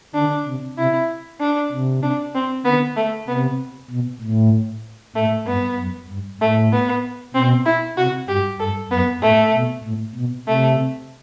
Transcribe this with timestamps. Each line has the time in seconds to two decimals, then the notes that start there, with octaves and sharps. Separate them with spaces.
0.14 D3 D4
0.46 C3
0.77 C3 E4
1.40 D4
1.72 C3
2.03 D4
2.34 C4
2.65 D3 B3
2.96 A3
3.28 C3 B3
3.90 B2
4.21 A2
5.15 A2 A3
5.47 G2 B3
5.78 F#2
6.09 G2
6.41 A2 A3
6.72 B3
7.34 B2 C4
7.66 E4
7.98 C3 F#4
8.28 G2 G4
8.60 G2 A4
8.91 F#2 B3
9.22 A2 A3
9.54 B2
9.84 A2
10.15 B2
10.47 C3 A3